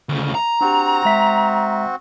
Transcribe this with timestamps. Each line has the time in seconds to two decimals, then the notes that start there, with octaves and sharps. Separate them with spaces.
0.09 D2 C#3
0.35 A#5
0.61 C4 D4 F#4 G4
1.05 G#3 E5 B6